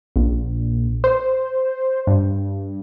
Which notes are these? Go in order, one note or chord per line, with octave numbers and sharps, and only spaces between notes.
A#1
C5
G2